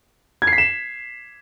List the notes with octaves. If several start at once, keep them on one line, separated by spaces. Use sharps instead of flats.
G#6
C7
B6
E7